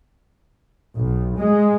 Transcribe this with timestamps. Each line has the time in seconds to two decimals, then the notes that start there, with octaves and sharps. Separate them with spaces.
0.97 B1
1.38 G#3